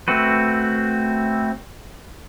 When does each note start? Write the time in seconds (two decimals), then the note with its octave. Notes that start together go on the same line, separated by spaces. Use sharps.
0.08 A3 C4 F#4 B4